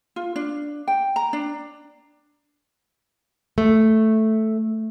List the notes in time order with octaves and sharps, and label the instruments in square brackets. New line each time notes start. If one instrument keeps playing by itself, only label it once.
[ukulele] F4
D4
G5
A#5
D4
[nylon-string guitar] A3